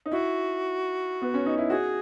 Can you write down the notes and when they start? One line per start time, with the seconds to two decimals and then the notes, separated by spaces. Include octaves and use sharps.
0.06 D#4
0.12 E4 F#4
1.22 B3
1.34 C#4
1.46 D#4
1.58 E4
1.70 F#4 G#4